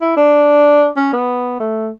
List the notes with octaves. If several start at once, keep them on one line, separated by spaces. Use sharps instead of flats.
E4
D4
C#4
B3
A3